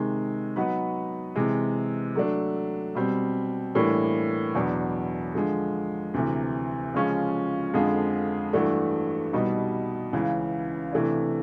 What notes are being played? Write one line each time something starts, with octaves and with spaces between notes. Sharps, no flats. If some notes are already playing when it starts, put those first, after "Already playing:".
Already playing: C3 D#3 G#3
F#3 B3 D#4 F#4 B4
C3 E3 G#3
F#3 A3 D4
B2 G3 C4
A2 E3 G3 A#3 D4
E2 B2 F#3 B3 D4
D3 F3 G#3
D2 C3 E3
C#3 F3 G#3 C#4 F4
F2 D3 F3 G#3
G2 E3 A3 D4 F#4
C2 B2 G3 B3 D#4
C#2 C#3 E3
C3 E3 A3 D4